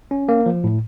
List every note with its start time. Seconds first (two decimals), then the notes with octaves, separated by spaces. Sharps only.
0.11 C#4
0.29 A#3
0.46 F3
0.64 A2